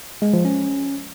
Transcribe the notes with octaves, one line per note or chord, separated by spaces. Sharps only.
G#3
F3
C#4